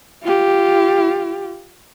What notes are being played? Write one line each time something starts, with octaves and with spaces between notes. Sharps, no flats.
F4 G4